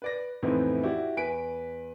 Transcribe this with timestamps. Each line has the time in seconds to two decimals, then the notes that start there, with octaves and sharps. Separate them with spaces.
0.02 B4 D5 A#6
0.42 F2 A2 E3 B3 C4 D#4
0.83 E4 F#4 G4 D5
1.17 E2 B4 G#5 B6 D7